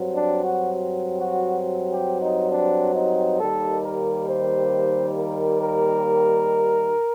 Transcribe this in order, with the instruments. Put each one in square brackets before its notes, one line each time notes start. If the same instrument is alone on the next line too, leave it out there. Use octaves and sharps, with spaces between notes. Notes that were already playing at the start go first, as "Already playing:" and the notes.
Already playing: [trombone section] G2 F#3 C4
D4
F#4
F#4
G4
D#4
D4
D#4
D#2 D#3 G3 A#3 A4
A#4
C5
A#4
A#4